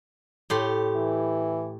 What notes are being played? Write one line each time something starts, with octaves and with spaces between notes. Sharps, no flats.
A2 G4 C6
E3